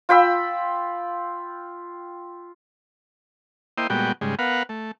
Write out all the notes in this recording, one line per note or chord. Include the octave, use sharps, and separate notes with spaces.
F4 G5 B5 E6
A#3 E4 C5 D#5 G5
A#2 G3 G#3 B3 F#4 G5
G#2 C#3 G3 G#3
B3 A#4 B4 F5 F#5
A3